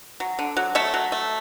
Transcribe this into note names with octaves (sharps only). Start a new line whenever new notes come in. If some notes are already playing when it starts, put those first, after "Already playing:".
F#3
D3
F#3
A3 C#5 E5
F#3
A3